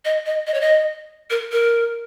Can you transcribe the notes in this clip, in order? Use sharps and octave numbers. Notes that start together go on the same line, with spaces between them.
D#5
D#5
D#5
C#5
D#5
A#4
A#4